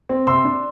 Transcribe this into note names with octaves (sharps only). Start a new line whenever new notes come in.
C4
C3 C6 E6
D4